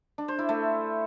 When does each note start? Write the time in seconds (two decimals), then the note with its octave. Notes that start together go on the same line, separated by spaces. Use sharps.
0.18 D4
0.28 C5
0.39 E4
0.49 A3